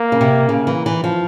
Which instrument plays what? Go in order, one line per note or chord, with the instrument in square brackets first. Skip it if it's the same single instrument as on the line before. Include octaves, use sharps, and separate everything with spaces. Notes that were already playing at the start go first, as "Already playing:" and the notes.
Already playing: [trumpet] A#3
[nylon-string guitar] C#3
C3
C#3
E3
E3
F3